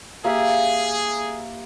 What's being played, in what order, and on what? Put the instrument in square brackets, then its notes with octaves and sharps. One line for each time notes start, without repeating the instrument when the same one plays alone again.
[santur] A#3 G4 E5 [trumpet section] G#4